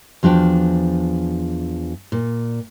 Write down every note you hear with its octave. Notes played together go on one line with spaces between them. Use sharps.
E2 F3 D4 F#4 G5
A#2